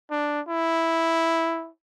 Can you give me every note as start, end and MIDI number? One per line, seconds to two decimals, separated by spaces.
0.11 0.41 62
0.48 1.69 64